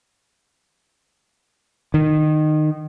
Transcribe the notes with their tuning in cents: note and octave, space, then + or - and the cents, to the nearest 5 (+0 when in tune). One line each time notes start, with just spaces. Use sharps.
D#3 -20